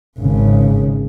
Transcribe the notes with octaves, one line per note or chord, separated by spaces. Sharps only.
G#1 C#3